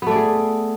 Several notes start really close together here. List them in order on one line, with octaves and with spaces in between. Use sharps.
B3 A3 D5 G#4